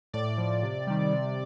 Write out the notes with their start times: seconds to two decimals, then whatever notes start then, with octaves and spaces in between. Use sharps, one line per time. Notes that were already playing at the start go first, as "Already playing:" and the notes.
0.13 A2 D5
0.38 F3
0.63 C3
0.87 D#3 G3
1.13 C3